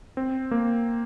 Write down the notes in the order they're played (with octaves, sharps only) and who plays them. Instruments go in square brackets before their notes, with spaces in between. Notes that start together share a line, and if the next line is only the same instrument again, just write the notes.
[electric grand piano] C4
A#3